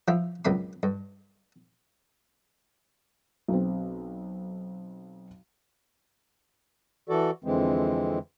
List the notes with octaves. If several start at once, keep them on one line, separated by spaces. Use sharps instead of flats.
F3 E4 F4
C#2 F#2 C4 B5 C6
G2
B1 C4
E3 F#4 A4 D5
F2 D3 E3 G#3 C4